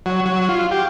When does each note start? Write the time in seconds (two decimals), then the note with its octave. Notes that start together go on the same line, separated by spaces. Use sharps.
0.06 F#3
0.25 F#3
0.49 F4
0.71 G4